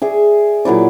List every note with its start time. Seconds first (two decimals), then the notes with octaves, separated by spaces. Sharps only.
0.02 G#4 D5 E5
0.65 A#2 F#3 E4 D5